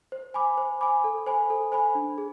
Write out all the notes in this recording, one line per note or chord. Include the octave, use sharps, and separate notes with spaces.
C5
G#5 B5 D6
C5
G#5 B5 D6
A4
C5 G#5 B5
A4
C5 G#5 B5
D4
G#4